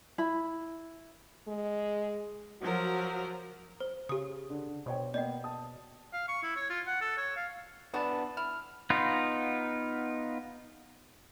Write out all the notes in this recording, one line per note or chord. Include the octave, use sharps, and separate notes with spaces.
E4 B5
G#3
F3 F#3 F#4 A#4
C5
C#3 G4 D#6
D3
B2 C5 C#5 G5
A#3 B3 D5 D#5 G5
A5 D#6
F5
C#6
E4
C#5
F4
F#5
A4
C#5
F5
E3 B3 D4 F#4 B4 A5
E4 F6
B3 D#4 F4